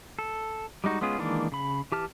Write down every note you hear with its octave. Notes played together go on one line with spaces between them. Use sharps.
A4
G3 G#3 D#4 F#4
G#3 B3 C#4 F4 G#4
D#3 E3 G#3 A#3 D4
C#3 B5
E3 G4 A5 F6